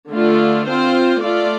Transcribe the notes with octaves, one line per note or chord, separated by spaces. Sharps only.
D3 A3 F4 D5
C4 F4 C5
A3 F4 D5